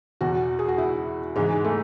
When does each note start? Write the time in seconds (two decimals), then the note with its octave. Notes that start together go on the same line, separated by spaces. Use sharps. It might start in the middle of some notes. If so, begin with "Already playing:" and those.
0.21 E2 B2 F#4
0.59 G#4
0.68 F#4
0.78 E4
1.36 G#2 E3 G#3
1.64 A3